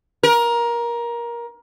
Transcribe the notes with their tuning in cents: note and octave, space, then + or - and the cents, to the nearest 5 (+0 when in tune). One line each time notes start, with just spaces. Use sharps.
A#4 +20